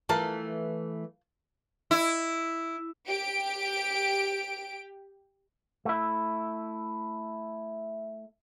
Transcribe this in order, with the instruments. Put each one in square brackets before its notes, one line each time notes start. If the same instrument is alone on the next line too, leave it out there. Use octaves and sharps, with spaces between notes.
[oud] E3 A3 A#4 [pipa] F4 A5
[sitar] E4
[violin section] G4 D7
[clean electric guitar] A3 E4